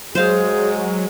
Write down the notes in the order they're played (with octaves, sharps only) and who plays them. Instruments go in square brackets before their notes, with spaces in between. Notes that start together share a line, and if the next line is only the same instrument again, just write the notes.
[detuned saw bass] F#3 [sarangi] G#3 [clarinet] G#4 [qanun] C5 F5